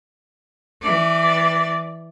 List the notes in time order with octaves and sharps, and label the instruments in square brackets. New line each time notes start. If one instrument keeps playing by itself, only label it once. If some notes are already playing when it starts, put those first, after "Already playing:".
[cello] E3 D5